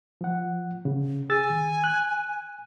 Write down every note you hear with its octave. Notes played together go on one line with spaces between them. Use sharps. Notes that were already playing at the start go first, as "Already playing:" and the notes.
F3 F#5
C#3
G#4 G#5 E6 A6
D#3
F#6